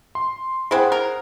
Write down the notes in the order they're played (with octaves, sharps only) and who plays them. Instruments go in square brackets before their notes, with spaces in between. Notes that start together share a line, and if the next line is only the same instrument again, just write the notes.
[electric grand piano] C6
[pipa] G#3 C4 E4 [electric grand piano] G#4 C5 F#5
[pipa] A#4